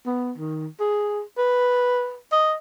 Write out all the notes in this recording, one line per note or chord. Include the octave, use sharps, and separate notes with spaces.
B3
D#3
G#4
B4
D#5